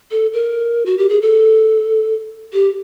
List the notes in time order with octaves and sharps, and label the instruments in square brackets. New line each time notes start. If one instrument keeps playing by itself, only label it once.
[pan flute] A4
A#4
F#4
G4
G#4
A4
G4